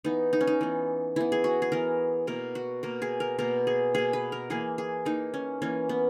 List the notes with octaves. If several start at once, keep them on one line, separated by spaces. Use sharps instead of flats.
E3 B3 D#4
D#4
C#4
D#4
E3 B3
E3 B3 E4
G#4
F#4
G#4
E3 B3 A#4
B2 A#3 A#4
F#4
B2 A#3 A#4
G#4
A#4
B2 A#3 A#4
G#4
B2 A#3 G#4
B4
A#4
E3 A#3 G#4
G#4
E3 A#3 D#4
C#4
E3 A#3 C#4
B3